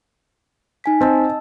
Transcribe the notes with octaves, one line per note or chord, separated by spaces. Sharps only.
D#4 G#5 B6
C4 D#5 A5 E6